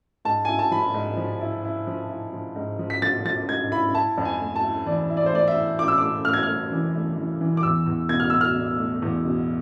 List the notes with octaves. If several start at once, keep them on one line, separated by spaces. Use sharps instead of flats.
G#2 A5
E4 G#5
A5
F3 B5
G#2
F3
E4
E4
F3
E4
F3
G#2
F3
B6
F3 A6
F3 A6
G#2 G#6
E4 B5
E4 A5
F2
G#5
A3
A5
E4
E3 D5
E4
D5
C5
A3 D5
E5
E4
E4 D6
E6
A3 D6
A3 F6
G#6
A3 F6
E3
A3
E3
E3
D6
E2 E6
E2
B2 G#6
F6
B2 E6
F6
B2
A3
E2
B2